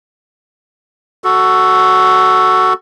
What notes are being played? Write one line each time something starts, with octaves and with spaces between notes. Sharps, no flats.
F#4 A4